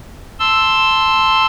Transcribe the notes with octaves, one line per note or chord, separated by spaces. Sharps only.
A5 C6 E6